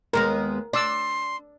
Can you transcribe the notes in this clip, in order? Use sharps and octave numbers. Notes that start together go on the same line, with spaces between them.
D#2 G#3 B3 A#4
D4 D5 C6 E6